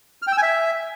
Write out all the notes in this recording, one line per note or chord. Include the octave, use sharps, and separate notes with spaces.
F6
G5
E6
G#5
E5